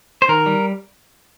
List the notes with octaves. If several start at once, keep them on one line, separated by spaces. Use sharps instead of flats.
C5
D#3 A#4
G3